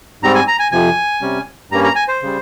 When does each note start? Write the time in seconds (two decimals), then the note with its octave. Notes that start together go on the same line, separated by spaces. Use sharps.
0.23 G#2 G3 C4 A#5
0.35 G#5
0.48 A#5
0.59 G#5
0.72 F2 C3 F3 G#5
1.22 C3 G3 C#4
1.71 G2 G3 A#3 C#4 A#5
1.84 A#5
1.95 G#5
2.08 C5
2.23 C#3 G3